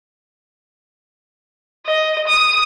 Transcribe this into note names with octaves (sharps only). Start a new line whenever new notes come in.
D#5
D#6